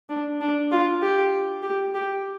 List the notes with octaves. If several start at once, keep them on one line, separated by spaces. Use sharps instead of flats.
D4
D4
F4
G4
G4
G4